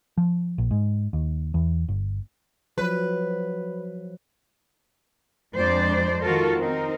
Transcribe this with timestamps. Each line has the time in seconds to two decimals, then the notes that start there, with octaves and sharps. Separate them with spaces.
0.18 F3
0.58 A#1
0.71 G#2
1.13 D#2
1.54 E2
1.88 G1
2.78 F3 F#3 B4
5.54 F2 G#3 D4 C5 D5
6.22 D#3 F4 F#4 A4 A#4
6.59 C4 D#4 A#4